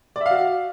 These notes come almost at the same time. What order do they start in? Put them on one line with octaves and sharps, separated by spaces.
D5 E5 F5 F#4